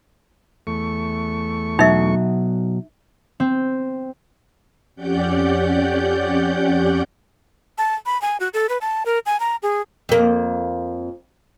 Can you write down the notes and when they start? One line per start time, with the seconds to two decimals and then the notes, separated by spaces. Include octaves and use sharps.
0.67 E2 A3 C#6
1.79 B2 F#3 D#4 E5
3.40 C4
4.96 F2 C#4 G4 D5 F#5 G6
7.78 A5
8.06 B5
8.22 G#5
8.40 F#4
8.54 A4
8.69 B4
8.81 A5
9.06 A#4
9.26 G#5
9.40 A#5
9.63 G#4
10.09 F2 A#3